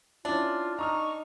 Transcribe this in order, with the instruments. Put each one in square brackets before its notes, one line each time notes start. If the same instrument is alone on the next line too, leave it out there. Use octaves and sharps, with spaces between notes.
[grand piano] C#4 E4 [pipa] D4 [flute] F4
[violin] D#4 [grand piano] A#5 D#6 F6 [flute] C#6